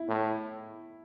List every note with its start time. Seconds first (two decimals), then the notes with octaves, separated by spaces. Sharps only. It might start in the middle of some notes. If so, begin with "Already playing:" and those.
Already playing: E4
0.09 A2